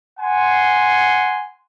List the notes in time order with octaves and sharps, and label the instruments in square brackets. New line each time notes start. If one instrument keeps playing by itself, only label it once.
[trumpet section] F#5 G#5 C6